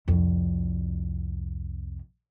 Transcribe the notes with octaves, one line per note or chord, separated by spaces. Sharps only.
C2 F2